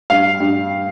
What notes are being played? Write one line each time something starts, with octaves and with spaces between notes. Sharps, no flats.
G2 F5
G2